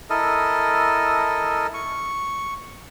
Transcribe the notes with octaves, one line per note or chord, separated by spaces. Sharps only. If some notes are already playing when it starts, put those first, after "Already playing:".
E4 A4 A#4 D#5
C#6